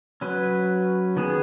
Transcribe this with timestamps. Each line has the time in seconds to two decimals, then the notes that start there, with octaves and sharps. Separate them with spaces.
0.21 F#3 C#4 B4
1.17 D#3 B3 G#4